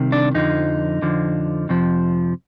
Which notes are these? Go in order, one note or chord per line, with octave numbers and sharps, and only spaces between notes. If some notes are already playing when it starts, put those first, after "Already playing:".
Already playing: C2 C3 D#3
D4
F2 D3 F3 D#4
F2 D3 F3
F2 C3 F3